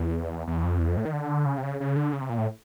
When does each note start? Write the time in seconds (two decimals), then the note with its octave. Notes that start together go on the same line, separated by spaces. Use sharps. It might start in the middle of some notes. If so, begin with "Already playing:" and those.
Already playing: E2
0.47 E2
0.64 F2
0.79 E2
0.88 F2
0.97 A2
1.05 D#3
1.13 D3
1.46 C#3
1.58 C3
1.63 C#3
1.80 C#3
1.96 D3
2.13 C#3
2.21 C3
2.30 A#2
2.38 A2